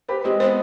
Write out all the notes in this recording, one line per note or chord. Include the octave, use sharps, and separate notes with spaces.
G4 B4 C5
G#3 C4 G4
B3 C5